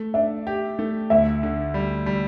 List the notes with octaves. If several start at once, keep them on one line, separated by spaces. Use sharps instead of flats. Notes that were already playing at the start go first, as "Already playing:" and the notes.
Already playing: A3
D4 E5
G4
A3
D2 E5
D3
G3
G3